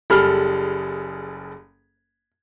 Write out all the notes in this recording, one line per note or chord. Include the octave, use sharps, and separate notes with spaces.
F#1 G3 G#4 A4 B5 F6